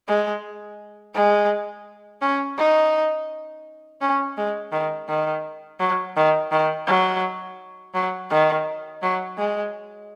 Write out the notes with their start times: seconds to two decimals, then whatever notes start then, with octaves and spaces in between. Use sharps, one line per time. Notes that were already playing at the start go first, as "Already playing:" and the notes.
0.08 G#3
1.15 G#3
2.22 C#4
2.58 D#4
4.01 C#4
4.38 G#3
4.72 D#3
5.08 D#3
5.80 F#3
6.16 D#3
6.51 D#3
6.87 F#3
7.94 F#3
8.31 D#3
9.02 F#3
9.38 G#3